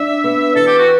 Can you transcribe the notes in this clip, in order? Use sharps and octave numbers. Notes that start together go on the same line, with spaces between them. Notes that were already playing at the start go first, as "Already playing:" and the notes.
Already playing: D4 E5
B3
E3 A4
G4
F#4